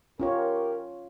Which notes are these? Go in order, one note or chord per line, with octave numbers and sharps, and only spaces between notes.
C#4 F4 G4 A#4 C#5